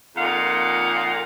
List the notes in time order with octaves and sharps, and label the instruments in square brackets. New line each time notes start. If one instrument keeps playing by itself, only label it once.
[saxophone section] F2 A#2 D#4 F5 F#5